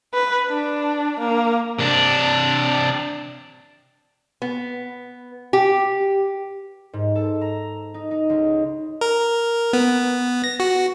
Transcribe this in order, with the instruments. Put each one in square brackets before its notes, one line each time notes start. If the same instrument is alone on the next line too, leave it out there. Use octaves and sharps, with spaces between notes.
[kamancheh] B4
D4
A#3
[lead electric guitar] C3 D4
[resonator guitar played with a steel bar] B3
G4
[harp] G#2
A4
A#5
D#4
D#4
C#2
[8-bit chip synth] A#4
B3
A#6
F#4